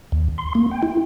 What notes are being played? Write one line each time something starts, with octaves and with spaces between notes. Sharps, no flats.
D#2
C6
A#3
G5
E4